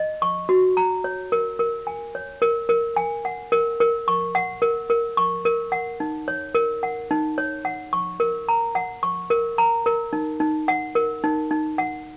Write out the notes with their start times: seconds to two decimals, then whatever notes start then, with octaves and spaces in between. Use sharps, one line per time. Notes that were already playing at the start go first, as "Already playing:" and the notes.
Already playing: D#5
0.22 C#6
0.49 F#4
0.77 A#5
1.04 C#5
1.32 A#4
1.59 A#4
1.87 G#5
2.15 C#5
2.42 A#4
2.69 A#4
2.96 G#5
3.25 F#5
3.52 A#4
3.80 A#4
4.08 C#6
4.35 F#5
4.62 A#4
4.90 A#4
5.17 C#6
5.45 A#4
5.72 F#5
6.00 D#4
6.28 C#5
6.55 A#4
6.83 F#5
7.11 D#4
7.38 C#5
7.65 F#5
7.93 C#6
8.20 A#4
8.49 A#5
8.75 F#5
9.03 C#6
9.30 A#4
9.58 A#5
9.86 A#4
10.13 D#4
10.40 D#4
10.68 F#5
10.95 A#4
11.24 D#4
11.51 D#4
11.78 F#5